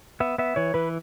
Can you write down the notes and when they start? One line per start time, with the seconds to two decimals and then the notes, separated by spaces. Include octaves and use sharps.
0.20 B3 E5
0.38 B3 E5
0.56 E3 C#5
0.74 E3 B4